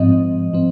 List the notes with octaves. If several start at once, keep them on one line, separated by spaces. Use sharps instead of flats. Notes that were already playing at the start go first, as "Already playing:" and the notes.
Already playing: G#2 F3 C4 D#5
F3 C4